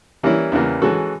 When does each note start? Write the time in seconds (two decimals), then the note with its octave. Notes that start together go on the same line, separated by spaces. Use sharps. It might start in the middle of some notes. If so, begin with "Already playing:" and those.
0.23 E3 G3 A#3 C#4 E4
0.52 E2 C#3 E3 G3 A#3
0.82 E3 G#3 C#4 F#4 A4